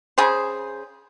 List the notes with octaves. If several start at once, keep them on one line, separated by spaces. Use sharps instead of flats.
C#3 G#4 C5